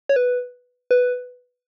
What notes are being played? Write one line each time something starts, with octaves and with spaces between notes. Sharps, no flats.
C#5
B4
B4